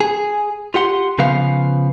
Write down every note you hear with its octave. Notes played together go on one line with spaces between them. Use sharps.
G#4
F4 G4 F#5 C6
C#3 F3 B3 B4 F5